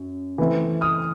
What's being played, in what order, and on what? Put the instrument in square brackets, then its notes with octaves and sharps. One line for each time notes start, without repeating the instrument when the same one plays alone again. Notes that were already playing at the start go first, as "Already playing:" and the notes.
Already playing: [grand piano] F#2
E3 A3 C4 E4
D#6 F6